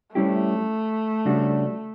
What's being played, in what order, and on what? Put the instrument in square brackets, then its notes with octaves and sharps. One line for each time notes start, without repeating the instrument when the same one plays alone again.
[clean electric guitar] G3 C#4 E4 G4 [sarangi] A3
[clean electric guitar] C#3 G3 D4 F#4